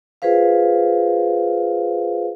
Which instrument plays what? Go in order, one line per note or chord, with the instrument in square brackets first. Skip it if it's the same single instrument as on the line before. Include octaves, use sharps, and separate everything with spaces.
[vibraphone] F4 G#4 B4 C5 F5